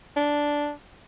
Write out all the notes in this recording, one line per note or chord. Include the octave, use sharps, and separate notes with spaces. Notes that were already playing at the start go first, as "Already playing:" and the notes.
D4